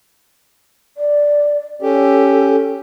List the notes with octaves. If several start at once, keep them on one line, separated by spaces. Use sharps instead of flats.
D5
C#4 G4 A4